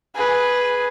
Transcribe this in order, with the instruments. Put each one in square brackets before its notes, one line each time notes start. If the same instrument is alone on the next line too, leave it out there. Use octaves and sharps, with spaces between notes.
[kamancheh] G#4 B4